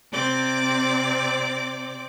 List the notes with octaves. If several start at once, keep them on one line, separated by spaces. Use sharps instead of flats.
C3 C4 D5 D6